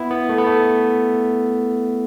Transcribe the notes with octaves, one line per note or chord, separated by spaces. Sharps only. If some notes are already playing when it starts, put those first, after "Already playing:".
Already playing: B3 E4
B3
A3
B3
A3